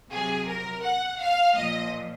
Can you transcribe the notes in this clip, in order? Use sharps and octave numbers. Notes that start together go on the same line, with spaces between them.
C3 F#3 G#4
A#4
F#5
F5
A#2 F3 D#5